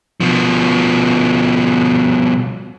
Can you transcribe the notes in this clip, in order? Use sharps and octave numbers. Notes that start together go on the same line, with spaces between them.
B2 F3